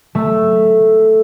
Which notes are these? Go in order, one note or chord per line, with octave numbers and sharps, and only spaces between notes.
A3